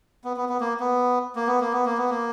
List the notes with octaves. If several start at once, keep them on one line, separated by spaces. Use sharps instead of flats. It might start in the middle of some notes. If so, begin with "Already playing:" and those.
B3
B3
B3
A#3
B3
A#3
B3
A#3
B3
A#3
B3
A#3